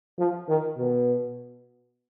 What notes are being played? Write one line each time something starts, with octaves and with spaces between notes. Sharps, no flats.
F3
D#3
B2